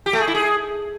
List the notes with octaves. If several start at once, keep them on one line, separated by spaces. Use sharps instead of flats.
G4
A3
G#4
E4
G#4